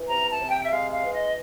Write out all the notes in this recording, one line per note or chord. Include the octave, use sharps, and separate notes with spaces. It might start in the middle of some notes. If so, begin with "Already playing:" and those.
Already playing: E3
C3 A#5
A5
C3
G5
E5
G#3 F5
F5
E3
D#5